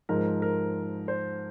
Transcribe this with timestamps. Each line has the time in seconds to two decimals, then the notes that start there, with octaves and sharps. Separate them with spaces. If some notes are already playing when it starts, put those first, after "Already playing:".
0.09 G#2 F3 G#3 A#4
0.42 A#4
1.08 C5